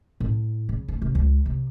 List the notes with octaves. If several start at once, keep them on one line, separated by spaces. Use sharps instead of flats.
A2
C#3
A3
C3
C#2
C3